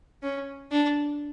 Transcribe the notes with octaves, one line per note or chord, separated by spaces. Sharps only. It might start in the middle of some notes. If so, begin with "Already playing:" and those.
C#4
D4